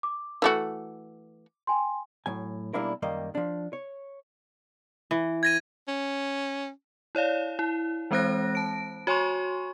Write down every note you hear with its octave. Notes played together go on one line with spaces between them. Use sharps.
D6
E3 A3 F#4
G5 G#5 C6
A2 F#3 G#5
B1 G3 A#3 D4 E4 A#4
F#2 D#3 G3 A#3 D#5
F3 D4
C#5
E3
G#6 A#6 D#7
C#4
E4 C#5 D5 F5
E4
E3 G#3 C4 C5 F#6 A#6
A5 D7
F#4 C#5 G#5 C6 C#6